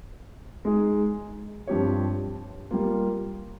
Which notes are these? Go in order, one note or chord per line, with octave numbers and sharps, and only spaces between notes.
G#3 D#4 G#4
G2 F3 C4 G4 C#5
G3 A#3 F4